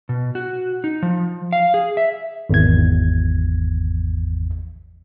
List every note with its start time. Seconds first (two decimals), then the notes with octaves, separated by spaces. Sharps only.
0.09 B2
0.35 F#4
0.84 D#4
1.02 F3
1.53 F5
1.74 G#4
1.97 E5
2.49 G#1 E2 G#6